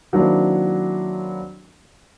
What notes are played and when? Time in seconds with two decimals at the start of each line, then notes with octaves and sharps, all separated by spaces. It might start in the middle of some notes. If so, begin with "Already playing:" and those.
0.13 D#3 F#3 A#3 C4 D4 E4